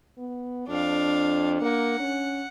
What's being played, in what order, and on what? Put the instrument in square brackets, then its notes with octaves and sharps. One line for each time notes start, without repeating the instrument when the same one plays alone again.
[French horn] B3
[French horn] F2 [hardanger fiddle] D4 F5
[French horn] A#3 [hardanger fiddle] F#5
[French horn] C#4